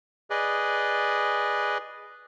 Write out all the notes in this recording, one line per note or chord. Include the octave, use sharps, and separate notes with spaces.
G#4 B4 D5 D#5